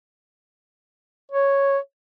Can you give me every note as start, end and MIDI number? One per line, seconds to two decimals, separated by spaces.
1.32 1.78 73